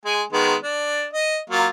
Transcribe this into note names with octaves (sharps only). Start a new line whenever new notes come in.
G#3 G#5
D#3 G#3 B3
D4
D#5
F#3 A#3 F4